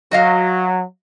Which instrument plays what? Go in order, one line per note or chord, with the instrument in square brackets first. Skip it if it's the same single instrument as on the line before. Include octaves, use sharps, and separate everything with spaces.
[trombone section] F#3 [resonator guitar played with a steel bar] F#4 D#5 F5